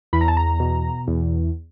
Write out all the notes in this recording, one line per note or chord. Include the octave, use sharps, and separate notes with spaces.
E2 B5
A#5
A5
A#5
B2
E2